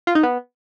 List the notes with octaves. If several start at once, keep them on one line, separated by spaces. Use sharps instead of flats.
F4
D#4
B3